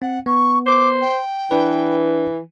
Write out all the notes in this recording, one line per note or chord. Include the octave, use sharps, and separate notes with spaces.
C4 F#5
B3 C#6
C5 D6
G5
E3 D4 B4